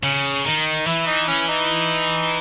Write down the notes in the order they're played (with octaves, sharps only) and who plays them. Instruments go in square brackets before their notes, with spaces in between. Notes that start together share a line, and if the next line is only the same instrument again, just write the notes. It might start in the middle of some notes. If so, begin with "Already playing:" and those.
[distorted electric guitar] C#3 [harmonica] C#4
[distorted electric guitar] D#3 [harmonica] D#4
[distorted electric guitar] E3 [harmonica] E4
[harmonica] D#4
C#4
D#4